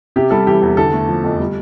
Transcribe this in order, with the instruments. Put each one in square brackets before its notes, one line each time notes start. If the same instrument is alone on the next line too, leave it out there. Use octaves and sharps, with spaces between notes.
[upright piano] C3 G4
G3 A4
E3 G4
E2
D3 A4
A3
F3
F2
G3